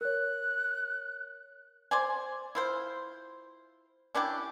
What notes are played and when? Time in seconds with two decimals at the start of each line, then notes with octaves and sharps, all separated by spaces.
0.01 A#4 C#5 F#6
1.91 C5 D5 G#5
2.55 E4 F4 C5
4.15 C#4 D4 E4 G4